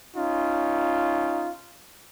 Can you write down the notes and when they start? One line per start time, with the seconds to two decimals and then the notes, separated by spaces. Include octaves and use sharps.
0.16 C#4 D#4 F4